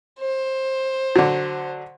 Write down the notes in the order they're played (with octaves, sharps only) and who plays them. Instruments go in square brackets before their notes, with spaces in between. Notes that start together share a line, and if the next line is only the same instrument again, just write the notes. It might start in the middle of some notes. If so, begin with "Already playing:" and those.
[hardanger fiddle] C5
[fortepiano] D3 F#3